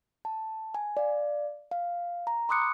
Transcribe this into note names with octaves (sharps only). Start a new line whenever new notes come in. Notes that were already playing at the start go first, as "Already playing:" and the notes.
A5
G#5
D5 F5
F5
A#5
B5 C6 D6 D#6 F#6 C#7